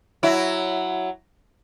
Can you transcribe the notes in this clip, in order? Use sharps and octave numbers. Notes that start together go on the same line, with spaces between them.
F#3 E4